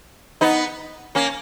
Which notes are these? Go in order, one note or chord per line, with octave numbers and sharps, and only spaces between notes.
B3 D#4
A#3 C#4